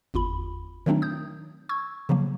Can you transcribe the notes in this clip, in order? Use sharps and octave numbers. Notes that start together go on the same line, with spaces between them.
G1 E2 F4 B5
D#3 F#3 A3 C4 D4 D#4
D#6 G6
C#6 E6 G#6
C#3 F3 F#3 A#3